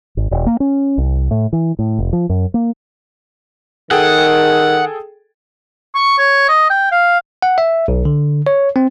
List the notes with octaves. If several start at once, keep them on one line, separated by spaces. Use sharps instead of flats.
G#1
E1
A#3
C#4
C2
A2
E3
A2
F1
F3
F#2
A#3
D#3 G#4 A4 F#5 G5
C#6
C#5
D#5
G5
F5
F#5
E5
B1
D3
C#5
C4